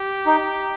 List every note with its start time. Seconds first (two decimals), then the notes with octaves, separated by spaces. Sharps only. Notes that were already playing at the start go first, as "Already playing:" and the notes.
Already playing: G4
0.26 D#4